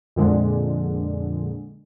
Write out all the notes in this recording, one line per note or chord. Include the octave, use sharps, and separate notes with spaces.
F2 A#2 D3 G#3